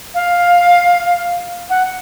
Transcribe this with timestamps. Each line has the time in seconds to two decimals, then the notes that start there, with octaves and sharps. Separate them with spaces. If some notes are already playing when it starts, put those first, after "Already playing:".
0.15 F5
1.70 F#5